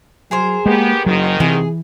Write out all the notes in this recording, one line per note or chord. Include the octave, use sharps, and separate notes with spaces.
F#3 G#4 A#4 C5
G#3 A#3 B3 G4
F#1 G#2 D#3 F#3
C3 E3 G#4